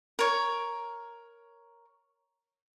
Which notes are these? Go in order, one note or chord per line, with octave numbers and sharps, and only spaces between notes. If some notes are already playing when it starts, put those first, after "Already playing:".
A#4 C#5